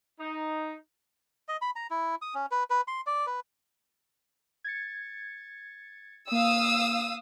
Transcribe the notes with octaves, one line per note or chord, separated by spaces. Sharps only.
D#4
D#5
B5
A#5
E4
D#6
C#4
B4
B4
C6
D5
B4
G#6 A6 C#7
A#3 F5 D#6 E6